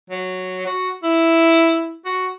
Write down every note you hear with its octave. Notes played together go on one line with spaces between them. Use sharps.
F#3
F#4
E4
F#4